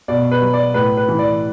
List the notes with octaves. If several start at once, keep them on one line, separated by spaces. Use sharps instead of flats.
B2 D5
B4
F#3
D5
A2 B4
B4
E3
D5